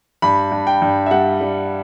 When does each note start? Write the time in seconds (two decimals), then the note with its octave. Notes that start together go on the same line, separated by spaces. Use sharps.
0.22 G2 B5
0.52 G2
0.67 G5
0.82 G2
1.06 E5
1.11 G3 F#5
1.41 G3